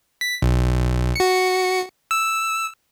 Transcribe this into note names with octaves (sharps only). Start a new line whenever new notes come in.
B6
B1
F#4 C#7
E6